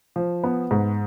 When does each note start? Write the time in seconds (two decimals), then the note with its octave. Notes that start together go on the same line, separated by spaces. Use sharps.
0.16 F3
0.44 B3
0.71 G#2